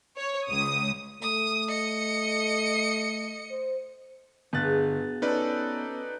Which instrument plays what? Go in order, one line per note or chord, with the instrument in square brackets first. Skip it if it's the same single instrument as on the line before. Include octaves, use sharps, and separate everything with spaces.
[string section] C#5
C#2 D#6
[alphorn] A3 [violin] D#6
[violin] D#5 C#7
[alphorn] C5
[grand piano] G1 F#6 A6 [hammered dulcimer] B2 G#4 [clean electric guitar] B3
[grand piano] C#4 A4 [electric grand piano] D#4 B4 D5